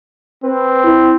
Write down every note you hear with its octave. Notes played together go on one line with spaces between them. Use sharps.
C4 B4
E4